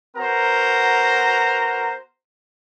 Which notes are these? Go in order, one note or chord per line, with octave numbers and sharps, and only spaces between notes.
B3 F#4 A#4 C5 F#5 A#5